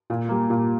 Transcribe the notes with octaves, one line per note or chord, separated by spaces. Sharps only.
A#2
G3 A#3
A#2